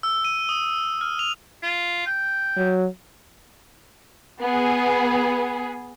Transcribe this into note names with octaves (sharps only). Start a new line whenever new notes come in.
E6
D#7
D#6
F6
F7
F4
G5
F#3
B3 G#4